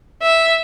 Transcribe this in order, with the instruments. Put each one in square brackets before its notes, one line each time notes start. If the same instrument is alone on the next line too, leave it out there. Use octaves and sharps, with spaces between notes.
[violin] E5